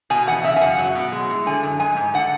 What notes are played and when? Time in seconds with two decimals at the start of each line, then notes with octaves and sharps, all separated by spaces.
0.10 B2 G#5
0.27 E2 F#5
0.44 C#3 E5
0.56 G#5
0.61 F#2 F#5
0.78 F#3
0.95 B2
1.12 G#3
1.29 A2
1.46 D3 G#5
1.63 F#2
1.80 G#3 G#5
1.97 G#2
2.14 D3 F#5